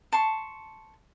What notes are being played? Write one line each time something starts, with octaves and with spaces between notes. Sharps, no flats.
A5 C6 C#6